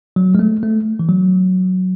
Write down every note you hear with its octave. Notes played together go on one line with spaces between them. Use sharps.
F#3
G#3
A3
A3
E3
F#3